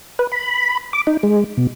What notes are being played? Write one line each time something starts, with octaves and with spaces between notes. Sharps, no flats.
B4
B5
D6
D#4
G#3
B2